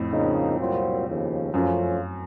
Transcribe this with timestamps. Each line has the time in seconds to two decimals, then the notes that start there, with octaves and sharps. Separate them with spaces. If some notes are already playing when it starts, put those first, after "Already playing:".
Already playing: F2 A2
0.11 C#3 F3 A#3 D#4
0.59 C2 A#2 F#3 C4 F4
1.06 D#2 C#3 F3
1.53 F#2 F3 A3 C#4 F4